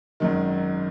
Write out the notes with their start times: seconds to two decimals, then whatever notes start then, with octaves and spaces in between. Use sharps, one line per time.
0.20 G#1 F#2 D#3